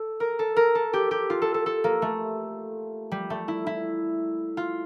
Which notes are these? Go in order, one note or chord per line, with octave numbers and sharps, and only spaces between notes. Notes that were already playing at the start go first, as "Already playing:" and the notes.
Already playing: A4
A#4
A4
A#4
A4
G4
G4
F4
A4
A4
A4
A#3
A3
G3
A3
E4
E4
F4